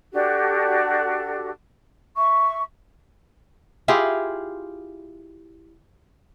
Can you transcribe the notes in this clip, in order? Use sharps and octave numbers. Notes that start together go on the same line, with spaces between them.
D4 F#4 G4 A4
E5 C#6
E4 F4 G4 G#4